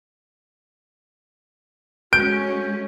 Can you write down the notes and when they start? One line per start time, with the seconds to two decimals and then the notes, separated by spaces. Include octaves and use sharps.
2.13 G#3 A3 C#4 F#4 G6 D7